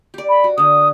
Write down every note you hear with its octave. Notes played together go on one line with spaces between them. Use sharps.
G4 D5
B5
F#4
D3 D4 D#6